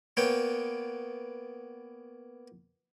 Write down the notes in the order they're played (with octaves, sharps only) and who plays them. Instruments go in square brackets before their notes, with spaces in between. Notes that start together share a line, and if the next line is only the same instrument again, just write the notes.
[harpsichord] A#3 B3 C#5 G5